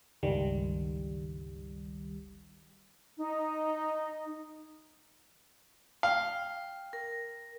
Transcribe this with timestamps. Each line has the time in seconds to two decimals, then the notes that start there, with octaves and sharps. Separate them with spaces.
0.23 G1 C#2 D#3 G3
3.18 D#4
6.03 F5 G5
6.93 A#4